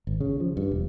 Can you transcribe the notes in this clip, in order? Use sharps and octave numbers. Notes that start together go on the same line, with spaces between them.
G#1
C#3
F3
G2
E1